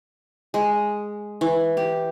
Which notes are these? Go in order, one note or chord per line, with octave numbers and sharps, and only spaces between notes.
G#3
E3
G4